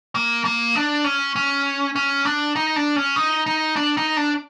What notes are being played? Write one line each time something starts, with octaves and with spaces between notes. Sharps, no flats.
A#3
A#3
D4
C#4
C#4
C#4
D4
D#4
D4
C#4
D#4
D#4
D4
D#4
D4